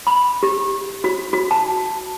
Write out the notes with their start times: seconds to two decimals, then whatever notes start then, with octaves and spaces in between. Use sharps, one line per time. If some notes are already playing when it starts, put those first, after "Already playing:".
0.07 B5
0.43 G4
1.04 F#4
1.33 F#4
1.51 A5